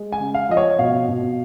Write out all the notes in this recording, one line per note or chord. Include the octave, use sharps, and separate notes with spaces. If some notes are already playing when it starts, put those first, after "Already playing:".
Already playing: G#3
G#5
C#3
F5
F3 D#5
C#5
B2 F5
B2